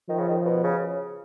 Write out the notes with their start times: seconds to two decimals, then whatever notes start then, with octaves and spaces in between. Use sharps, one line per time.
0.09 D#3 F3
0.18 C#3
0.28 D#3
0.46 B2
0.64 C#3